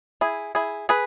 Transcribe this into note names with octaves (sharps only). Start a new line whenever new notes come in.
E4 G#4
E4 G#4
G#4 B4